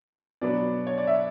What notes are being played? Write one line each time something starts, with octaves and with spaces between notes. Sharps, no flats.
B2 F#3 B3 D4 D5
C#5
D5
E5